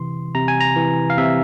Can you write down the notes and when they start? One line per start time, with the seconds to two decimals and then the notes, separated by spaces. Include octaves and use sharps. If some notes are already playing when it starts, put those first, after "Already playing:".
Already playing: C3 E3 C6
0.35 C3 A#5
0.48 G#5
0.60 A#5
0.76 E3
1.10 F5
1.18 C3 E5